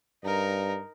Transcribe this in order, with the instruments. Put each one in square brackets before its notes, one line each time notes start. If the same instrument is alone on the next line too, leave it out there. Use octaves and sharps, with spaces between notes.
[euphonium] G2 [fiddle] D#4 A#4